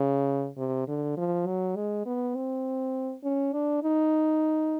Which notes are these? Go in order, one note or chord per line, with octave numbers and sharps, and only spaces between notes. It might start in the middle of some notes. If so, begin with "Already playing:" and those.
Already playing: C#3
C3
D3
F3
F#3
G#3
B3
C4
C#4
D4
D#4